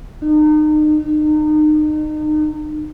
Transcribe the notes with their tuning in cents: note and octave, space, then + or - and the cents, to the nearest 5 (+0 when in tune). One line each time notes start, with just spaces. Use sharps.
D#4 -35